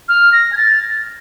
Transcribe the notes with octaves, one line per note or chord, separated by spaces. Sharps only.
F6
A#6
G#6
A6